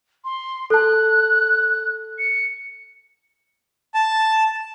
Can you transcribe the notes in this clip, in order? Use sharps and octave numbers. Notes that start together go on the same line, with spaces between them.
C6
A4 A5 F#6
C#7
A5